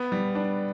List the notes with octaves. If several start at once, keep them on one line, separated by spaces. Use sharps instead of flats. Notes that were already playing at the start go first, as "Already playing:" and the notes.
Already playing: B3
G3
D4